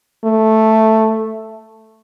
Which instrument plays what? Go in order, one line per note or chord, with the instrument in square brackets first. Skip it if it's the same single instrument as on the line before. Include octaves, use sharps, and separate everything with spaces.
[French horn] A3